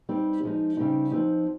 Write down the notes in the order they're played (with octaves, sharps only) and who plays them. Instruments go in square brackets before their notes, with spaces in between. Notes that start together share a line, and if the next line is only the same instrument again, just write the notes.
[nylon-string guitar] G3 C4 D#4
F3 G#3 D#4
C#3 G3 C4 D#4
F3 C4 D#4